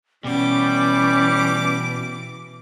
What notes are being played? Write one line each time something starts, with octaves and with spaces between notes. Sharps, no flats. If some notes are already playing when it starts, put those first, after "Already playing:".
B2 E3 G3 C#4 D6